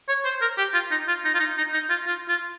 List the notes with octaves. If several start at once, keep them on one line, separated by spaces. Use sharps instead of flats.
C#5
C5
A#4
G4
F4
D#4
F4
D#4
F4
D#4
D#4
D#4
F4
F4
F4